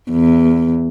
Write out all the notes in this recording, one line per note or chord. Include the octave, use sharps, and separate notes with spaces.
E2